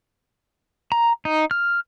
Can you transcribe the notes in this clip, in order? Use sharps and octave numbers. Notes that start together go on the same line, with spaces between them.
A#5
D#4
F6